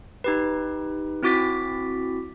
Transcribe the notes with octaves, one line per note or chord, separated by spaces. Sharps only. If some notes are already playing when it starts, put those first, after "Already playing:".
D#4 G4 B4
C4 E4 F#4 D6 A6 B6